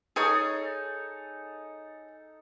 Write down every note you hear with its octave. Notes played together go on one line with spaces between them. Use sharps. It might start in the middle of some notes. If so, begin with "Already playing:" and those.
D#4 G#4 A4 C#5 D#6